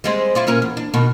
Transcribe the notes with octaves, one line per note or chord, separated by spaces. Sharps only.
G3 G#3 C4
E4 F4 D5
A#2 C#4 A#4
E2
D4
B2 D#3